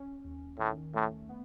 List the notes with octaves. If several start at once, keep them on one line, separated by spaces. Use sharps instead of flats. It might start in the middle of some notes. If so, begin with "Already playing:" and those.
Already playing: C#4
D#2
A2 D#3
A2 A3
B3